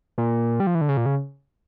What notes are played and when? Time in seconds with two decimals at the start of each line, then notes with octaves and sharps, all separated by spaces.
0.18 A#2
0.60 G3
0.67 F3
0.75 E3
0.81 D3
0.89 C#3
0.97 A#2
1.06 C#3